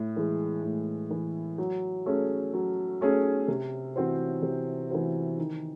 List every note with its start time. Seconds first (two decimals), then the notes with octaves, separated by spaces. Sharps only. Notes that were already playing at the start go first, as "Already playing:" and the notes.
Already playing: A2
0.16 E3 G#3
0.63 A2
1.11 E3 G#3
1.58 F#3
2.06 A3 C#4 G#4
2.53 F#3
3.01 A3 C#4 G#4
3.48 C3
3.96 E3 C4 F#4 C5
4.43 C3
4.91 E3 C4 F#4 C5
5.38 D#3